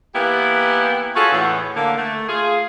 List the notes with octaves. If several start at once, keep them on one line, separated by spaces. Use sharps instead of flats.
E3 A#3 B3 E4 G4 A#4
C#4 F4 F#4 G#4 A4
E2 A2 B3
D3 A#3
A3
F4 G#4